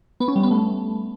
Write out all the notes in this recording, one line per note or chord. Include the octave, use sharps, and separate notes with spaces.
B3
C#4
G3
B3
A3